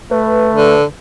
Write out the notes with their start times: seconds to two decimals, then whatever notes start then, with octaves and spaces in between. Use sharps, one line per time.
0.11 A3 B4
0.54 D3